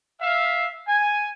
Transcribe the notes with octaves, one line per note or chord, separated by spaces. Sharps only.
E5 F5
G#5